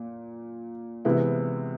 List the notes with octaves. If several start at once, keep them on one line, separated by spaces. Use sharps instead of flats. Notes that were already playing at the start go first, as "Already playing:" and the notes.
Already playing: A#2
C3 E3 G#3 B3 E4